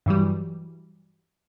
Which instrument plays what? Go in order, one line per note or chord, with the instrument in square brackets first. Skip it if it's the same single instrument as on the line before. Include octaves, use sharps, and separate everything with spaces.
[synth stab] G2 E3 F#3 G3